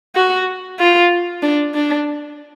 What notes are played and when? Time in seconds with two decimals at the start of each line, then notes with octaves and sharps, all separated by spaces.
0.16 F#4
0.79 F4
1.43 D4
1.74 D4